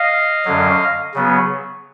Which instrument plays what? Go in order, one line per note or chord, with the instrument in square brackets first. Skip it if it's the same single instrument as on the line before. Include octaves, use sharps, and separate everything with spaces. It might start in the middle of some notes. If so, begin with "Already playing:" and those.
Already playing: [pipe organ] D#5 F5
F#2 D3 F#3
C#3 F#3 B3